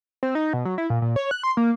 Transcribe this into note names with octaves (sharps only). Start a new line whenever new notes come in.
C4
D#4
B2
F#3
E4
A#2
A#2
C#5
F#6
C6
A#3